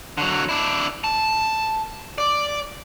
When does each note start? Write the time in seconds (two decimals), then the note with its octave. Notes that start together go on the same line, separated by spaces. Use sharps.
0.18 D3 F#3
0.49 D4 E4
1.04 A5
2.18 D5